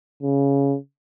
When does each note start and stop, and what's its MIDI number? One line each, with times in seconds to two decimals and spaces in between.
0.23 0.77 49